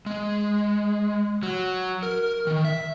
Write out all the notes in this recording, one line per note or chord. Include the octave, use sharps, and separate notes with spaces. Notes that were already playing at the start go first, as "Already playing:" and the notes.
G#3
F#3
A#4
D#3
E5